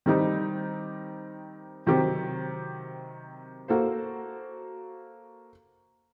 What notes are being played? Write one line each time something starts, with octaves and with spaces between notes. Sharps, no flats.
D#3 G3 C4 D#4 G4
C3 D#3 F#3 C4 G4
A#3 F#4 A4 C5